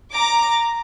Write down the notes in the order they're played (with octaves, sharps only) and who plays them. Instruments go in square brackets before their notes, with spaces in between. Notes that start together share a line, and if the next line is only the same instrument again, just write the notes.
[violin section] A#5 D6